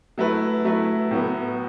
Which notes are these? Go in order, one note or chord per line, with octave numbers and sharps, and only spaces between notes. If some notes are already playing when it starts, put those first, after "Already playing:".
F#3 A3 E4 B4
F#3 A3 E4 B4
A2 F#3 B3